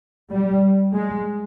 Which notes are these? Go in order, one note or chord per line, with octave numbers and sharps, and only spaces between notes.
G3
G#3